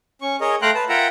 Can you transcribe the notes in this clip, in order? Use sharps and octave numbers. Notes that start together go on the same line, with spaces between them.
C#4 C#6
G#4 A#4 C#5 D#5
A3 F5 G5 A#5 C6 F#6
B4 A5
F4 A#4 E5 F#5 G5 A#5